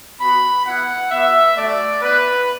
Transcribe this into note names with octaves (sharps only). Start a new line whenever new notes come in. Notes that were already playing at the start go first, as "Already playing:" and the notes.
B3 F#4 B5
B3 E4 F#5
B3 F#4 E5
A3 F#4 D5
B3 E4 B4